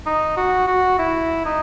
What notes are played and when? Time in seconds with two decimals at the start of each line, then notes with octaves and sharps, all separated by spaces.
0.06 D#4
0.37 F#4
0.67 F#4
0.98 E4
1.45 D#4